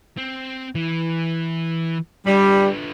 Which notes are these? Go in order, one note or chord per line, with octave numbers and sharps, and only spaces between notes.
C4
E3
D3 G3 B4